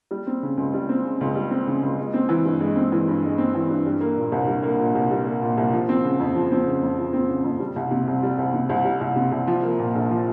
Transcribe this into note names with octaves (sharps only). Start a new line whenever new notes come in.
G3
C4
C#3
C#2
G3
C4
C#3
C#2
G3
C4
C#3
C#2
G#3
C4
E3
G2
G#3
C4
E3
G2
G#3
C4
E3
G2
G3
A#3
A#2
C2
G3
A#3
A#2
C2
G3
A#3
A#2
C2
F3
C4
C#3
F2
F3
C4
C#3
F2
F3
C4
C#3
F2
G3
C2
C3
C2
G3
C2
C3
C2
G3
C2
C3
C2
F3
A#3
A#2
A#1
F3